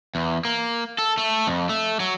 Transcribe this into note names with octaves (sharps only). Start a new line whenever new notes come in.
E2
A#3
A4
A3
F2
A3
F#3